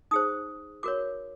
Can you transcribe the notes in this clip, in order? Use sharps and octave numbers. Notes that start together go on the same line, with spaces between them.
D#4 G#4 C5 D#6
F#4 A#4 C#5 D6